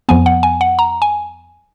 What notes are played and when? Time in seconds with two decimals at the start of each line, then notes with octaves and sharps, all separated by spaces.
0.09 F2 F3 B3 G#5
0.26 F#5
0.43 G#5
0.61 F#5
0.79 A#5
1.02 G#5